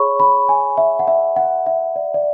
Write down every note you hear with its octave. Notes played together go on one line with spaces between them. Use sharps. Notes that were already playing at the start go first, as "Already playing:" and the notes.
Already playing: G#4 C#5 B5 C#6
B5
G#5
E5
F#5
E5
F#5
E5
D5
D5